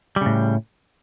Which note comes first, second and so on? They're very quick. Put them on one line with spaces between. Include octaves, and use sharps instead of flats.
G3 C#3 A2